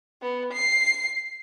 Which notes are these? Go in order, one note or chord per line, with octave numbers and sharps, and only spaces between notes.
B3
C7